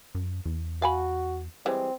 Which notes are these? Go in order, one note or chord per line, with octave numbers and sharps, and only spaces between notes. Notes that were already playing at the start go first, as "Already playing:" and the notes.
F#2
E2
F#4 F5 G#5 B5
E3 G3 G#3 C4